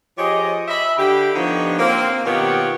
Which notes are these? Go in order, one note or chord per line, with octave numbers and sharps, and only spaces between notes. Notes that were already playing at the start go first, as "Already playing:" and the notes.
F3 G4 G#4 C#5 D#5
D#5 E5 B5
D3 G4 G5
D3 F3 B3 D#4 G4 C#5
A#3 C4
B2 D#3 B3 F4 G4 C#5